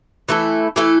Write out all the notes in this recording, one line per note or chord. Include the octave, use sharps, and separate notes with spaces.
E3 A3 E4 A4
E3 A3 E4 A4